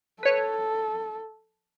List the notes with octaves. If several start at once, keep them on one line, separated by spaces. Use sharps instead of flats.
A4 B4 C#5